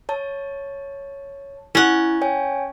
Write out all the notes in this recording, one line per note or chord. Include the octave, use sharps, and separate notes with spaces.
C#5 A5
C#4 E4 F#5
C#5 G5 G#5